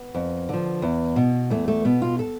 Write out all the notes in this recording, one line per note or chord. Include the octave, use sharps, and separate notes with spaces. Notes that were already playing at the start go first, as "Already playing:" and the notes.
Already playing: B3
F2
D3 F3
E2
B2
E2 A3
A3
B2 B3
F4
A4